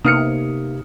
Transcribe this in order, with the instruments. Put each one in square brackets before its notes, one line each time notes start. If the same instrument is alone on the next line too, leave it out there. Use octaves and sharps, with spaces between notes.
[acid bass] C3 [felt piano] A#3 B3 D#4 [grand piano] D#6 F6 C#7